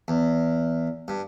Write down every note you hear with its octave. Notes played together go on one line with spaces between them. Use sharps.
E2
G2